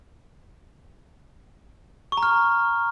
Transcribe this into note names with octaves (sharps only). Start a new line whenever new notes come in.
C#6
A#5
F6